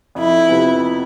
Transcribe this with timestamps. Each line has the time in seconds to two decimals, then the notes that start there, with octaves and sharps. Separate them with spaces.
0.15 F2 E4
0.49 C3 F3 B3